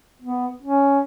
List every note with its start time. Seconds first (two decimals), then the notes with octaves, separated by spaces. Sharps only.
0.22 B3
0.62 C#4